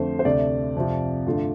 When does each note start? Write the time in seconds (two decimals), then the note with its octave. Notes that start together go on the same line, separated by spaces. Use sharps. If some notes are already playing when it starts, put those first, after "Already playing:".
Already playing: F2 D3 A3 C5
0.19 C5
0.25 D2 C3 A3 D5
0.76 F2 C3 F3
1.26 G2 D3 A3 F4